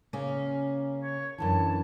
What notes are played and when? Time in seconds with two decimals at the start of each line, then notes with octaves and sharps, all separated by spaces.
0.13 C#3 A#3 C#4
1.00 C#5
1.38 F#2 D3 E3 A5